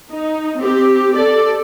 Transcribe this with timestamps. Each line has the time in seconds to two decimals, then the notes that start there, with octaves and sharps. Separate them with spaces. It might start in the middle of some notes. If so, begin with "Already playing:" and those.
0.11 D#4
0.57 C4 G4
1.15 A4 D5